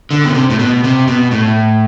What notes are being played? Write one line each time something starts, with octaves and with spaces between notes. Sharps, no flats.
D3
B2
C3
A2
B2
C3
B2
A2